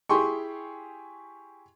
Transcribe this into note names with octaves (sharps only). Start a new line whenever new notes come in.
E4 G4 G#4 G5 C6 C#6